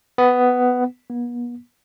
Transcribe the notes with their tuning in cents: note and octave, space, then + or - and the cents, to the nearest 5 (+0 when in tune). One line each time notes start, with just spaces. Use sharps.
B3 +10
B3 -40